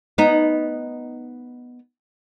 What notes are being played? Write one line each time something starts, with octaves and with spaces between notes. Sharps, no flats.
B3 D#4